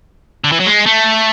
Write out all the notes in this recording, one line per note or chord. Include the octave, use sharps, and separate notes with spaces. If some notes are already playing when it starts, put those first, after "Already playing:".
D3
E3
F#3
G#3
A3